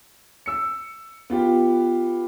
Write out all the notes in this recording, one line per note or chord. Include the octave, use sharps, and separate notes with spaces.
E6 C#7
B3 F4 G4